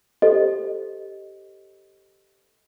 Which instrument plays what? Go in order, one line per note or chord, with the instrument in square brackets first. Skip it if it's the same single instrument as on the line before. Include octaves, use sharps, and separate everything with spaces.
[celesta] G4 A4 C5 D#5